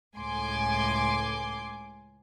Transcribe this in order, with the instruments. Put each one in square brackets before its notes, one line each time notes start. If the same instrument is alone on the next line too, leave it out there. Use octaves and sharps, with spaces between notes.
[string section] C#2 A2 G#5 C6 D6